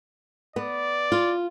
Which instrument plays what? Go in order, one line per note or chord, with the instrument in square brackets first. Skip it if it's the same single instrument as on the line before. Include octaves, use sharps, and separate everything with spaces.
[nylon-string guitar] B3 [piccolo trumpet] D5
[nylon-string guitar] F4